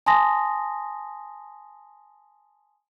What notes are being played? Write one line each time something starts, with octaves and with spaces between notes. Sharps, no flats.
G#5 A5 C6 D#6 A#6